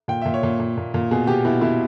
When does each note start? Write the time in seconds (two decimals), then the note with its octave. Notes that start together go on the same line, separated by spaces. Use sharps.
0.08 A#2 G5
0.22 A#2 E5
0.34 C#5
0.43 A#2
0.60 A#2
0.77 A#2
0.94 A#2
1.11 B2 G#4
1.27 B2 G4
1.45 B2 E4
1.61 B2 E4